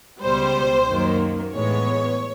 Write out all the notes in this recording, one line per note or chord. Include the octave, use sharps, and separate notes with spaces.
C#2 B2 G3 C5
F#2 D#3 F#3 A#3
A2 E3 G#3 B3 C#5